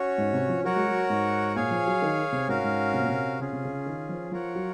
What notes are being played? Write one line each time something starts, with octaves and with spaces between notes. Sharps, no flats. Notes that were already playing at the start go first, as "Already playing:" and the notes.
Already playing: C#4 F#4 C#5
G#2
C3
F3
F#3 F#4 A#4 C#5 F#5
G#3
F#3
G#2
A#2 G#4 C#5 F5 G#5
F3
F#3
D#3
C3
G#2 C#4 F#4 A#4 F5
G#2
C3
A#2
C3
C#3 C#4 F4 G#4
C3
C#3
D#3
F3
F3 F4 A#4 C#5 F#5
F#3